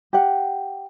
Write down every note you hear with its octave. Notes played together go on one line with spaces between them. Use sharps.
G4 F#5